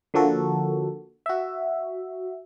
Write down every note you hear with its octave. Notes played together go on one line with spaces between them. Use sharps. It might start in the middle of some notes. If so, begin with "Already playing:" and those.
D3 F3 A#3 F#4 A4
F#4 E5